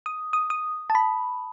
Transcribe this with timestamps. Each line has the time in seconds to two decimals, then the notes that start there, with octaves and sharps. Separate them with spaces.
0.06 D#6
0.33 D#6
0.50 D#6
0.90 A5
0.95 B5